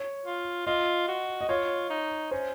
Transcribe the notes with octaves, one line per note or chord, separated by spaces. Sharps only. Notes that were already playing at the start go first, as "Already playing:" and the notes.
Already playing: C#5
F4
F4 D#5
F#4
D#5
F4 C#5
D#4
C#4 C5